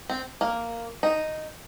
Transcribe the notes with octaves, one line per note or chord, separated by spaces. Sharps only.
C4
A#3
D#4